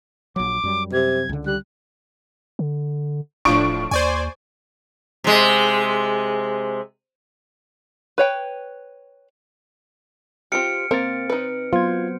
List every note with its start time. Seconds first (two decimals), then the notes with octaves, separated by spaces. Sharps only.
0.36 A#1 F#3 D6
0.63 F#2 G3
0.93 C3 G#6
1.29 C#2 D3
1.46 G3 F#6
2.59 D3
3.45 D1 A2 F3 D4 C#6 D7
3.91 D#2 C5 D5 G#5
5.24 C3 G#3
8.18 B4 C#5 G5
10.52 C4 F4 G4 F6 C#7 D7
10.91 A#3 C4 A#4 C5 A6
11.30 D#4 B4
11.73 F#3 B3 F4 C5 G#6